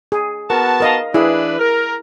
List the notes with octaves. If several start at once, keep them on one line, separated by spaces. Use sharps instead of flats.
G#4
B3 F#4 A#4 A5
A#4 D#5 F5
E3 D4 E4 G#4 B4
A#4